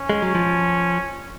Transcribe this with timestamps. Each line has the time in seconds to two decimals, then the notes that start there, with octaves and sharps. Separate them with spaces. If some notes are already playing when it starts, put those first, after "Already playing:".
Already playing: C#4
0.10 G#3
0.22 F#3
0.35 F3